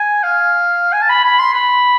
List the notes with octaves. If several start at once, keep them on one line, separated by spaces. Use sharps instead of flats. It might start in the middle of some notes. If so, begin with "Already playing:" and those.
Already playing: G#5
F5
G#5
A5
B5
B5
C6
B5